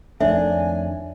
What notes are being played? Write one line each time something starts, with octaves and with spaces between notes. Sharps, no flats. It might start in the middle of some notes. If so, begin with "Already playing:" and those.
F2 D#3 A3 D4 C#5 E5 G#5